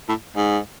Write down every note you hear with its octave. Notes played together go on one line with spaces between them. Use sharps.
A2
G#2